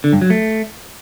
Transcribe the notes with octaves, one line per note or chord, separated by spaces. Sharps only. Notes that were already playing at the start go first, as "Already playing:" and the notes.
D3
G2
F#3
A3